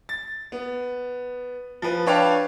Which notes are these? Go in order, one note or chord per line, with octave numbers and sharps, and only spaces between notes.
A6
B3
F3 B4
D4 B4 C#5 F5 G5 A5